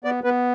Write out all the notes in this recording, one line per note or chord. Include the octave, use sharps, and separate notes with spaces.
B3 D5
B3 B4